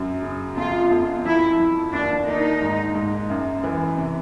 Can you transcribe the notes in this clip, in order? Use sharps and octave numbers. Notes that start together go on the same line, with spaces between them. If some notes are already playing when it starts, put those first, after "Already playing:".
Already playing: F#2 F#3
C#3
F2 F4
F2
F3 E4
F3
D#2 D4
A#3 D#4
G#2
G#2
F#2
E3
C3